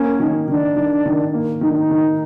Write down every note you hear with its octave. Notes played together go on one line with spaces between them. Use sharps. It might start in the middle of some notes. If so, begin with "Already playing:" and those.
Already playing: A#3 C#4
D#3
D#3 D4
D#3
D#3
A#3
D#3 D#4
D4
D#4
D#3